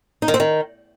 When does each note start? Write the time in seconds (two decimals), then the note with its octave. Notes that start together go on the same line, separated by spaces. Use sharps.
0.22 D#4
0.28 D#3
0.34 C4
0.40 D#3